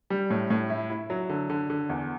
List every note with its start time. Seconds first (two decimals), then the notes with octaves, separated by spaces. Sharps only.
0.10 G3
0.30 A2
0.50 A2
0.70 E4
0.90 E4
1.10 F#3
1.29 D3
1.50 D3
1.70 D3
1.89 E2